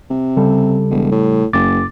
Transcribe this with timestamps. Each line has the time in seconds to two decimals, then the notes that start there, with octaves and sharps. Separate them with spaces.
0.10 C3
0.37 C#3 G3 A4
0.90 E1
1.12 A2
1.53 F#1 F#2 D6 A6